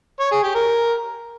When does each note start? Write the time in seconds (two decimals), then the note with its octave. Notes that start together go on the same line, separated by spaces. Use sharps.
0.20 C#5
0.32 G#4
0.43 G4
0.55 A#4